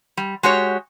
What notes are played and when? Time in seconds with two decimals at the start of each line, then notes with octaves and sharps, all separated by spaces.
0.17 G3
0.43 G#3 F#4 G4 C#5